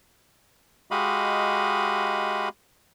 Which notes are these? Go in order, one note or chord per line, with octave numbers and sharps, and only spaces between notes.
G#3 F#4 G4 D#5 F5 B5